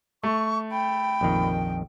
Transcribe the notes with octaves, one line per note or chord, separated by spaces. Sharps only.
A3 C#6
G5 B5
A#1 F2 D#3